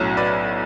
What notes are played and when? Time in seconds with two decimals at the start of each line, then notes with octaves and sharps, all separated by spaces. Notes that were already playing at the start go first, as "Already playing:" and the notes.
Already playing: B1 A2 F#3 C#4
0.17 B4 D5